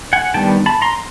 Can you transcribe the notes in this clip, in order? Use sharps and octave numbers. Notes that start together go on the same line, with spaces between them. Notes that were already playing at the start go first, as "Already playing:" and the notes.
F#5 G#5
D#3 G3 B3 D4 G5 A5
A5 B5
A#5 C6